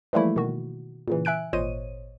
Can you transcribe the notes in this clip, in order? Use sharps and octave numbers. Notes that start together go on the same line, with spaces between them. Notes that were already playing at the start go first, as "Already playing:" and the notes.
E3 F3 G3 A3 A#3 E4
B2 D#3 F#4
A#2 C#3 E3
E5 G#5 F#6 D7
G#1 A#2 C5 C#5 D#5 D#7